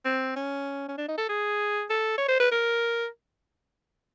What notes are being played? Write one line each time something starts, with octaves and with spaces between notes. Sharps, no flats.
C4
C#4
C#4
D4
D#4
A4
G#4
A4
C#5
C5
B4
A#4